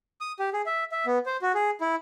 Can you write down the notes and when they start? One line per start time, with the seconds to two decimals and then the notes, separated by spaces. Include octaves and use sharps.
0.21 D#6
0.39 G4
0.53 G#4
0.66 E5
0.92 E5
1.06 B3
1.26 C5
1.42 F#4
1.55 G#4
1.81 E4